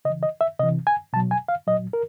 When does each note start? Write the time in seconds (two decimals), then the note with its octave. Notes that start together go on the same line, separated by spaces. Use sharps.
0.05 C#3 D#5
0.10 E3
0.23 D#5
0.41 E5
0.59 C3 E3 D#5
0.87 G#5
1.13 B2 F#3 A5
1.31 G#5
1.48 F5
1.67 A#2 F#3 D#5
1.93 A#4